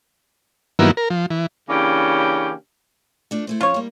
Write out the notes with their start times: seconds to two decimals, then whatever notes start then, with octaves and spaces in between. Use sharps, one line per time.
0.79 G2 D#3 F#3 A#3 B3 E4
0.97 A#4
1.10 F3
1.30 E3
1.70 C#3 E3 A#3 C#4 D4 G4
3.31 A3 D4 F4
3.47 A3 E4 C5
3.61 F3 C#4 F4 C#5
3.74 G3 A#3